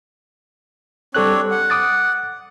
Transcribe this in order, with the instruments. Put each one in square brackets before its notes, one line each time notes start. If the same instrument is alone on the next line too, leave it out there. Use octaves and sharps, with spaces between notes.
[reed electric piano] G3 A4 F#6 [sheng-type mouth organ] C4 D4 C#5
[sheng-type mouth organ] F#5
[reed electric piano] D6 D#6 A6